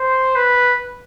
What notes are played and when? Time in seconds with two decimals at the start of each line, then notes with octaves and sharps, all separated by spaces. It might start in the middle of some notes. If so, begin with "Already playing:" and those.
Already playing: C5
0.35 B4